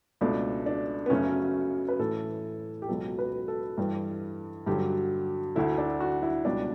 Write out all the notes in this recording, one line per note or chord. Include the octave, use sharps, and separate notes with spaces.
C#2 B2 A3 D4
D4
B3
F#2 C#3 F#3 A3 C#4
B4
A2 E3 A3 A4
G4
C#2 B2 F#3 A4
B4
A4
G2 E3 G3
G2 D3 F#3 G4
D2 D3 A3 E4
D4
F#4
E4
C#2 B2 G3 D4